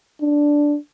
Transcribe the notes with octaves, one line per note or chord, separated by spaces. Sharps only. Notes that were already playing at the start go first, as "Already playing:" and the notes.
D4